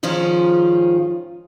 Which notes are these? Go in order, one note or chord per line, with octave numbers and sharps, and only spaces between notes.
G#2 D#3 F3 C#4 F4 G#4